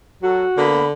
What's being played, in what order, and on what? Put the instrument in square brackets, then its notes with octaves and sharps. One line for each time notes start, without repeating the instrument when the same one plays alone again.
[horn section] F#3 A4 [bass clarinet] F#4
[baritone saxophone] D3 [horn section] A#3 B3 B5